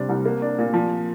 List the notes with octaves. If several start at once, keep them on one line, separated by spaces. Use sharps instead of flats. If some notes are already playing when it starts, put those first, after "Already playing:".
Already playing: C3 G3 D4
C2
A#3
D4
A#2
F3